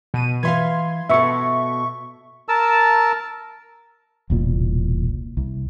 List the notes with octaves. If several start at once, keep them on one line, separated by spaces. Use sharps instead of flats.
B2 D#7
E3 E5 F5 C6 G#6
B2 A4 E5 C#6
A#4 A5 E6
E1 C2 A#2
C2